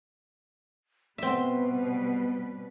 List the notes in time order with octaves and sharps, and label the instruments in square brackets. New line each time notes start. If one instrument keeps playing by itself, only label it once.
[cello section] B2 G3 B4 [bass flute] B3 [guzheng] C4 E5